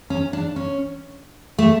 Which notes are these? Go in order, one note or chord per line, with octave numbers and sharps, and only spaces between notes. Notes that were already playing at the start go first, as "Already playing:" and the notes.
C#4
D4
C#4
A3